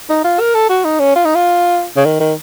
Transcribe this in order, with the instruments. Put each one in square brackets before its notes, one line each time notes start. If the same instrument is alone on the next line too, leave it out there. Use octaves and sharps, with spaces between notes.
[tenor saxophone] D#4
F4
A#4
A4
F#4
D#4
C#4
F4
D#4
F4
C#3
D#3
D#3